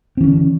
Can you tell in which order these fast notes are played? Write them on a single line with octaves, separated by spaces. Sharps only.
C4 E3 C#4 D3